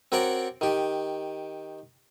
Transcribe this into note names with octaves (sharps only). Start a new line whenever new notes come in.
C4 F#4 A#4 C#5 D5
D#3 G4